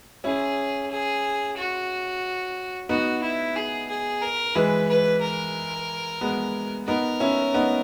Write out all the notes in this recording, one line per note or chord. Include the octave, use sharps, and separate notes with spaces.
C#4 E4 G#4
G#4
F#4
B3 D#4 F#4
E4
G#4
G#4
A#4
E3 G#3 B4
B4
A#4
G#3 B3
B3 D#4 A#4
C#4 E4
B3 D#4